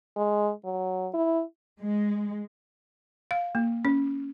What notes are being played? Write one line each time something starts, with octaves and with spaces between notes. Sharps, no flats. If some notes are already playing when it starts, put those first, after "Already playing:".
G#3
F#3
E4
G#3
F5
A#3
C#4